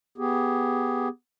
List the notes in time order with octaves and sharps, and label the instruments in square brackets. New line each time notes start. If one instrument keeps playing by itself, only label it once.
[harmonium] B3 G4 G#4